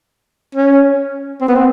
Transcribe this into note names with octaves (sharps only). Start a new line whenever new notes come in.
C#4
C4
B3
C4